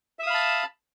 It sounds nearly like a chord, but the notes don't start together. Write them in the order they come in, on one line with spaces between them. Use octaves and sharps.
E5 D#6 F5 B5 A5